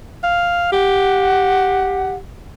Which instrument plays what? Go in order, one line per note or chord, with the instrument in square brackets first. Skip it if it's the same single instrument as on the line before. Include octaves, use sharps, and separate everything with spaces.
[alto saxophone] F5
[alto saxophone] G4 [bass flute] F#5